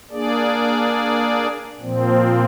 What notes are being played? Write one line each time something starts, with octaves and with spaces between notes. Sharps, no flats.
A#3 D4 G#4 D5
A#2 F3 C4